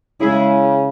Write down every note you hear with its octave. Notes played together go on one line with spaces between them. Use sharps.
C#3 G#3 E4 G#4